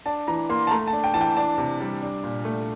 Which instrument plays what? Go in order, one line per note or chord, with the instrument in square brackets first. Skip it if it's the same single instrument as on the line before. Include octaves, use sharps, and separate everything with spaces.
[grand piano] D4 A5
E3 A#5
A#3 C6
A5
A3 A#5
A5
D4
G5
E3 A5
G5
D4 A5
C3
G3
D4
A#2
A3